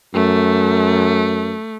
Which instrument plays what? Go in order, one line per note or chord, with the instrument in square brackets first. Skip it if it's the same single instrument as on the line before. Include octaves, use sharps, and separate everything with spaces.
[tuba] F#2 [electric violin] A3